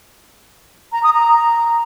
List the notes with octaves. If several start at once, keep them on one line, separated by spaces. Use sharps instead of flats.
A#5
D#6
A#5